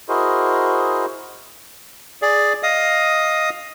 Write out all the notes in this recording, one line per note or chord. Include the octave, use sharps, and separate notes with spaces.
E4 F#4 G#4 A#4 C5 D#5
G#4 D5
D#5 F5 D#6